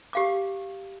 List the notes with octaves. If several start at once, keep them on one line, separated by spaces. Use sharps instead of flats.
G4 F5 D6